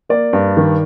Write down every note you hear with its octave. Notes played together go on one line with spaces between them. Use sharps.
A#3 D5
G2
D#3